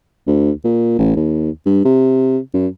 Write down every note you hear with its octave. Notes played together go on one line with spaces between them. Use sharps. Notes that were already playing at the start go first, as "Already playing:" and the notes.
D2
A#2
A1
D#2
G2
C3
F#2